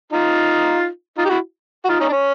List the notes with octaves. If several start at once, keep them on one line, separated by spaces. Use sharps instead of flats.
D#4 F4
D#4 F4
G4
E4 F#4
F#4
D#4 F4
C#4 D#4
D4
C#4